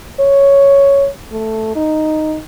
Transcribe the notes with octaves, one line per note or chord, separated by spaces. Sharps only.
C#5
A3
D#4